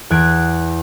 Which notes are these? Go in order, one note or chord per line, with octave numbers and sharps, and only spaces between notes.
E2 F#6 G#6 D7